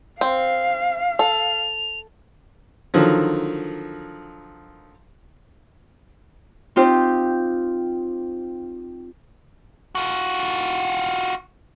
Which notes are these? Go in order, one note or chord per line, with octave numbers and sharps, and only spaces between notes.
C4 F5
A4 F7
D3 D#3 F3 F#3
C4 D#4 F4 G4 C5
F4 F#4